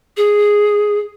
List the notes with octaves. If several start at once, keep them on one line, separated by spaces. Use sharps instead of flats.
G#4